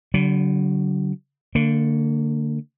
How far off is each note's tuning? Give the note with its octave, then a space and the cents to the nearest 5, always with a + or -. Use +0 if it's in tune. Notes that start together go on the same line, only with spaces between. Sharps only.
D3 -30 F#3 +30
D3 +0 A#3 -40